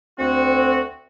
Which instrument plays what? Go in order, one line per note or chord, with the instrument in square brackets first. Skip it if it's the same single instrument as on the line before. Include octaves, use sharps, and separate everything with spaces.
[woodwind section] D2 F#4 [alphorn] C4